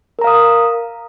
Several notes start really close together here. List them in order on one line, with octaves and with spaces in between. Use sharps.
A#4 A#5 F5 D#6